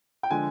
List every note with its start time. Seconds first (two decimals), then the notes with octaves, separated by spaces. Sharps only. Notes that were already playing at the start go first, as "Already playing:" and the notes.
0.23 G5
0.31 D3 F3 G#3 G#5